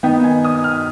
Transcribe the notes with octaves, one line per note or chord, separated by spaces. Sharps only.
D#3 B3 D#4 G5
G#5
D#6
F6